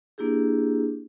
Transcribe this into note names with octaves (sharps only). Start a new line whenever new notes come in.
A#3 D4 E4 G4 G#4